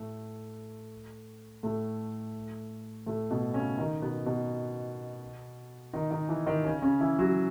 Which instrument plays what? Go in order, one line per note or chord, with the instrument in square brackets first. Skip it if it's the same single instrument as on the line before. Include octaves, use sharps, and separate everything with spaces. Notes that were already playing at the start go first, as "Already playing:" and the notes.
Already playing: [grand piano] A2 A3
A2 A3
A2 A3
B2 B3
C#3 C#4
D#3 D#4
B2 B3
B2 B3
D#3 D#4
D#3 D#4
E3 E4
D#3 D#4
C#3 C#4
C#3 C#4
E3 E4
F#3 F#4